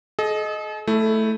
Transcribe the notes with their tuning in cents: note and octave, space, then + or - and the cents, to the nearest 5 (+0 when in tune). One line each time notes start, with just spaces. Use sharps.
A4 -45 D#5 +0
A3 +0 E4 +0 G#4 +25